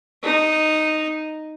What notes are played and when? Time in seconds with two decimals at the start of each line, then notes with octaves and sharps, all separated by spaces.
0.23 D#4